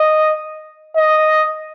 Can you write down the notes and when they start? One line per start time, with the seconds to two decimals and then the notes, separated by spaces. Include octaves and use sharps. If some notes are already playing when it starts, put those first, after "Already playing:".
Already playing: D#5
0.97 D#5